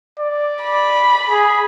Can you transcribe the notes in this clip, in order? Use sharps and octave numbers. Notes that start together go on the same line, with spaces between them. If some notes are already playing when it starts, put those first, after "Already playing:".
D5
B5
G#4